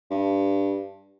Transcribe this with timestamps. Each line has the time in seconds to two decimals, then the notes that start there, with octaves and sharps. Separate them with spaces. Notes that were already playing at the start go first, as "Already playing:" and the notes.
0.11 G2